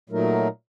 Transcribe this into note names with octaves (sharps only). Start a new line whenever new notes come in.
A#2 F#3 A3 D#4 A#4